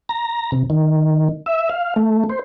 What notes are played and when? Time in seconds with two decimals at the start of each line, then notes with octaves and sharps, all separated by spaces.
0.09 A#5
0.52 C3
0.70 D#3
1.46 E5
1.70 F5
1.96 A3
2.29 C5